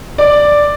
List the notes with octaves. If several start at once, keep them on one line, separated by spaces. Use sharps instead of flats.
D5